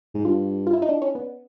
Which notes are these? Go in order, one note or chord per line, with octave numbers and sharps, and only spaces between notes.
G#2
G2 F4
F4
E4
D#4
D4
C#4
B3